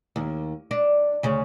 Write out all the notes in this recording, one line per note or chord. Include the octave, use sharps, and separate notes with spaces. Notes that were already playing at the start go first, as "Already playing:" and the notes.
D#2
D4
D2 C#3